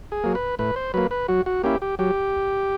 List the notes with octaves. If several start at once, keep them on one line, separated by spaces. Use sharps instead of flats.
G#4
F#3 A#3
B4
A2 B4
C5
F#3 A#3 B4
B4
F#3 F#4
F#4
A#3 C#4 E4 G4
G4
F#3 G4